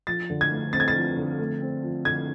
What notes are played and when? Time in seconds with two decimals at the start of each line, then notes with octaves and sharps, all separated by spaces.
0.07 F3 A6
0.30 D3
0.41 G#6
0.51 A3
0.73 C4 A6
0.80 G#6
0.88 A6
0.95 F3
1.17 D3
1.39 A3
1.61 C4
1.83 F3
2.05 D3 G#6